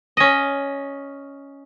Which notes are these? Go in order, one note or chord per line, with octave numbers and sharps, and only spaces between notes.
C#4 D#5